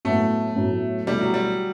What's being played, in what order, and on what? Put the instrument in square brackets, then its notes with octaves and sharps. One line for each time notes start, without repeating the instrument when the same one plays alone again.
[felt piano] A2 F#3 B3 E4 [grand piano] A3
[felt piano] A2 F#3 B3 E4
[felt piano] B2 A3 E4 G4 [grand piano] G3
[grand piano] F#3
G3